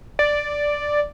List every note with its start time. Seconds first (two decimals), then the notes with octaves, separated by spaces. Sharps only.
0.19 D5